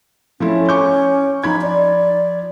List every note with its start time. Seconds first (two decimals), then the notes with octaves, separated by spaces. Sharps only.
0.40 F3 A3 C#4 E4
0.69 C#6 D6 G6
1.43 F3 D#4 B5 G#6
1.62 D5